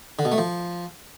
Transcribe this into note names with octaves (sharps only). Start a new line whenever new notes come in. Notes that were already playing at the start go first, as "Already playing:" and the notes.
D3
B2
A3
F3